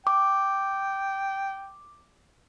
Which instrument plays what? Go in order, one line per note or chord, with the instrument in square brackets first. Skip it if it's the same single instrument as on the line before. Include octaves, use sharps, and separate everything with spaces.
[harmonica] G5 [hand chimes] D6